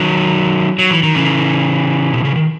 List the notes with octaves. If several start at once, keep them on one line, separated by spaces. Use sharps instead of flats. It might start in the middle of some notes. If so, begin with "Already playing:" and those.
Already playing: D#3 F#3
F#3
E3
D#3
C#3 E3
B2
C#3
D#3